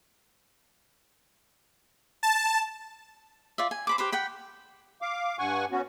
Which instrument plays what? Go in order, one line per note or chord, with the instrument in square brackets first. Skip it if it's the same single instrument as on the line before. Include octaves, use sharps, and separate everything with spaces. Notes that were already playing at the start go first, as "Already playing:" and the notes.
[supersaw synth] A5
[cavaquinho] F4 D5 E5
G#5
C5 B5 D6
G4 B4 C5 B5
F#5 G5 B5
[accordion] F5 D6
G2 F#5 G#5 C#6
B3 C#4 F#4